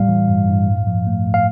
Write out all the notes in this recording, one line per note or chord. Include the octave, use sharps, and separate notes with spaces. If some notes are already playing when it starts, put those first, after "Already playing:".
Already playing: A2 G3 F5
E3
G2
G2
A2
F3
A3
A2
F5